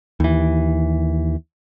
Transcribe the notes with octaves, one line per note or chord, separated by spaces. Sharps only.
D#2 E3